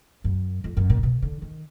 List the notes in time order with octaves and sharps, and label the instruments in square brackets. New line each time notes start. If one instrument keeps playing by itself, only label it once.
[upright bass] F#2
F2
F#2
A#2
B2
D3
D#3